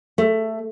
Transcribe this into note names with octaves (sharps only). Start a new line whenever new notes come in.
A3